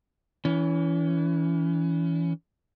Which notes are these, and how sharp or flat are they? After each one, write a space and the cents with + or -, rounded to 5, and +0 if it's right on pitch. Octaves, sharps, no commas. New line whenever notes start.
E3 +0 C#4 +30